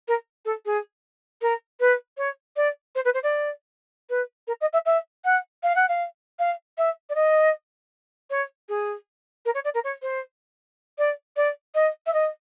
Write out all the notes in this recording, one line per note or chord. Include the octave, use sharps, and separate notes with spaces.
A#4
A4
G#4
A#4
B4
C#5
D5
C5
B4
C5
D5
B4
A#4
D#5
E5
E5
F#5
F5
F#5
F5
F5
E5
D5
D#5
C#5
G#4
A#4
C#5
D5
A#4
C#5
C5
D5
D5
D#5
E5
D#5